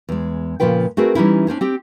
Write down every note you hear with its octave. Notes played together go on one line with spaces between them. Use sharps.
E2 G#3
A#2 C#3 F3 B4 G5
A3 C4 F#4 G#4 A#4 B4
E3 G3 A#3 C#4 D#4 E4
C#4 D4 C5 C#5
C4 G4